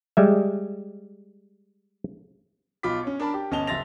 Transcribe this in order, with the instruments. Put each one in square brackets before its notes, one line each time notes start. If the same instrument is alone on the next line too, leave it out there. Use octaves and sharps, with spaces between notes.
[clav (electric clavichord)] G3 G#3 E5
[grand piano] B1 F4 B5 D6 B6
C#4 C#5
D4 A#4 A5 B5
G4
G1 C#4 D#5 A5 F7 G7
F#1 E5 C6 A6 A#6 F7